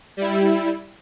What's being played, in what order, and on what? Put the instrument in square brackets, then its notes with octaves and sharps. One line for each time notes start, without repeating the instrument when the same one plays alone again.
[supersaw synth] G3 E4